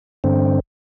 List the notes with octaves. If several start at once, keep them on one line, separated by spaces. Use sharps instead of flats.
G2 D3 C4